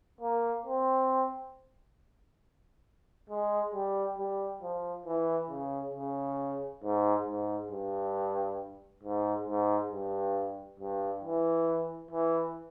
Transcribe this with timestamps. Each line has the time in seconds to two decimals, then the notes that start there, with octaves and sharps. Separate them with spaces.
0.21 A#3
0.65 C4
3.30 G#3
3.74 G3
4.18 G3
4.62 F3
5.06 E3
5.50 C#3
5.94 C#3
6.83 G#2
7.27 G#2
7.71 G2
9.03 G#2
9.47 G#2
9.91 G2
10.79 G2
11.23 E3
12.11 E3